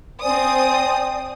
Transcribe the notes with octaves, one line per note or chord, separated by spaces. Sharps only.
C4 C5 D5 G#5 D#6